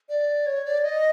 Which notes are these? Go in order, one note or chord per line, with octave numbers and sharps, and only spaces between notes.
D5
C#5
D5
D#5